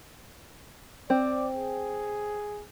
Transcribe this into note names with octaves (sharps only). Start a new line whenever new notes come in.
C4 D5
G#4